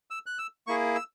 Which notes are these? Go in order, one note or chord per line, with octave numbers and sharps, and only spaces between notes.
E6
F#6
E6
A#3 E4 G#4 C#6
E6